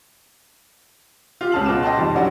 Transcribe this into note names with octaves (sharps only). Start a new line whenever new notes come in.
F4 G4
C#2 C#4 G#4 A5 F6 F#7
B2 F4 D6 E7
D#5 G5 A5 C6
F2 D#3 G3 A5
E3 F#3 G3 C#4 D4 F#4